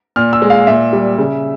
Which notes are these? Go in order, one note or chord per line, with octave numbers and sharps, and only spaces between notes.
A#2 F6
E6
G#3
F5
A#2 E5
G3
C#3